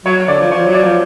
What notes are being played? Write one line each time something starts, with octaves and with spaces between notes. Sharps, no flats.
F#3 C#5
D3 D5
F3
F3 C#5
F#3
D5
F3